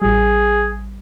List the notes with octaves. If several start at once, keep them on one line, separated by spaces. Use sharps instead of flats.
A1 G3 G#4